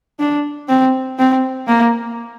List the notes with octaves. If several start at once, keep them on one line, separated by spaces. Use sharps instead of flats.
D4
C4
C4
A#3